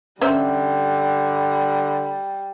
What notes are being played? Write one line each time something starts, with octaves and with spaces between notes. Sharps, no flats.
D3 G3 C#4 C5 E5